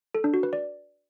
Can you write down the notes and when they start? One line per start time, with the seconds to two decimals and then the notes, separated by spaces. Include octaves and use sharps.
0.15 A4
0.24 D4
0.34 F#4
0.43 B4
0.53 D5